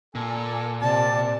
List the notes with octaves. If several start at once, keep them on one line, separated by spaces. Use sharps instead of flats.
A#2 A4 G#5
C3 D5 A5